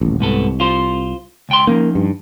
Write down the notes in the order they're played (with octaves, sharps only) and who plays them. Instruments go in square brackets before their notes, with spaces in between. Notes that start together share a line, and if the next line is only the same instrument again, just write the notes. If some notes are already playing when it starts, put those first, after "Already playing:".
[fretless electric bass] D#1 A1
[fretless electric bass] C2 [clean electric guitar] G#2 B3 A4
[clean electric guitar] F4 C5
C#2 G5 C6
[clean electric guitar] F3 C#4 D#4 [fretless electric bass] A#3
[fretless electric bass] G2